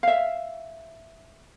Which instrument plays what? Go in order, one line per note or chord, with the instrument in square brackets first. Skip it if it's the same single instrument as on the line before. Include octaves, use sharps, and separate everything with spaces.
[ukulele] E5 F5